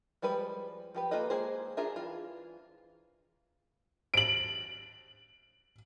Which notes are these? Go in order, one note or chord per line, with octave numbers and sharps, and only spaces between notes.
F3 G3 G#3 B4
F3 G4 B4
A#3 F4 A4 B4 D#5
G#3 A#3 G#4 C5
D4 F4 G#4 A#4 E5
E3 F4
D7 F#7